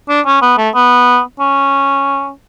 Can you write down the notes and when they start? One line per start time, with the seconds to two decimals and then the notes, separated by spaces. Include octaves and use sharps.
0.09 D4
0.26 C#4
0.42 B3
0.58 A3
0.74 B3
1.40 C#4